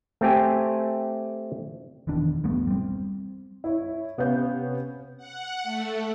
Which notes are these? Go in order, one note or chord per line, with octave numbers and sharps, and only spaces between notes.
A3 C4 G4 G#5
E1 E2 D#3 D4
E1 G2 A3 B3
G3 C4
E4 C#5
C3 B3 C#4 F5 G6
F#5
A3